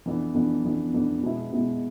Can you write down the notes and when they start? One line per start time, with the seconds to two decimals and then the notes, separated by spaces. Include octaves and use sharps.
0.06 F2 E3 B3 D4
0.34 F2 E3 B3 D4
0.64 F2 E3 B3 D4
0.93 F2 E3 B3 D4
1.23 B2 G#3 B3 E4
1.52 B2 G#3 B3 E4